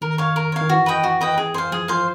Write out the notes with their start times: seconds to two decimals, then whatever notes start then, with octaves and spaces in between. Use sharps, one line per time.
0.02 D#3 A#4
0.18 C#5 F5
0.36 A#4
0.52 C#5 F5
0.61 D#3
0.69 E3 F#4
0.86 B4 D#5 G5
1.04 F#4
1.21 B4 D#5 G5
1.38 G#4
1.54 C5 F5
1.71 F3 G#4
1.88 F3 C5 F5